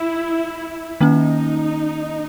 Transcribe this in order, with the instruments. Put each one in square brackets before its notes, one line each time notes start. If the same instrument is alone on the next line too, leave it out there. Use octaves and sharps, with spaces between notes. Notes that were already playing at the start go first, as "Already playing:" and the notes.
Already playing: [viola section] E4
[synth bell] D#3 A#3 C#4 [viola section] D#4